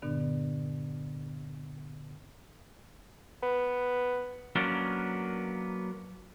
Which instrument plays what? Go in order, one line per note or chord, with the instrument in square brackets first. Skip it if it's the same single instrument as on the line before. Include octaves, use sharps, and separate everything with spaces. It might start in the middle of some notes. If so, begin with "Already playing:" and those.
[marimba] G2 A#2 D3 B3 D4
[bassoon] B3
[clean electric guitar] F#3 A#3 B3 C#4 D4